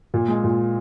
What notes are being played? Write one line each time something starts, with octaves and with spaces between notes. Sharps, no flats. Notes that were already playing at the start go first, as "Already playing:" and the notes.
A#2
G#3
A#2